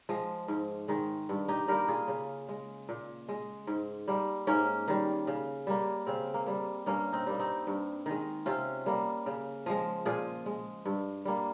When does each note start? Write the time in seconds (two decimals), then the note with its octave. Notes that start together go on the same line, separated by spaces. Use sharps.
0.09 F3 G#3
0.48 G#2
0.88 D#3 G#3
1.29 G2
1.48 D#4 G4
1.68 G3 A#3 G4 A#4
1.88 F4 G#4
2.08 C#3
2.49 G#3
2.89 A#2
3.29 G#3
3.67 G#2
4.08 G3 A#3
4.47 G#2 A#3 C#4
4.88 D#3 G3
5.27 C#3
5.67 G3 A#3
6.07 C#3 C4
6.34 A#3
6.46 G3 A#3
6.86 G2 A#3 C#4
7.13 C4 D#4
7.26 G3 A#3
7.39 C4 D#4
7.67 G2
8.06 D#3 G#3
8.46 C3 C#4 F4
8.86 G3 A#3
9.26 C#3
9.66 F3 G#3
10.06 A#2 F4 G#4
10.46 G#3
10.85 G2
11.25 G3 A#3